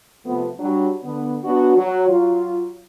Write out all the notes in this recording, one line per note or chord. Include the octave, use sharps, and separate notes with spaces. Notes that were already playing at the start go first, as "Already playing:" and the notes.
C3 F3 A3 B3
F#3 G3 D4
D3 B3
F#3 B3 D4 F#4
F#3
F#3 F4